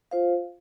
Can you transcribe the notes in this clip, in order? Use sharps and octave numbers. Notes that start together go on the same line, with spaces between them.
F4 C5 F5